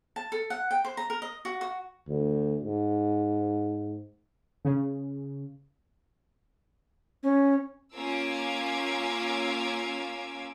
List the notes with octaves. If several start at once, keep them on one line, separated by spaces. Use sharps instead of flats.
A5
A4
F#5
G5
C5
A#5
A#4
D#5
F#4
F#4
D2
G#2
C#3
C#4
A#3 C#4 F4 D6 E6 G#6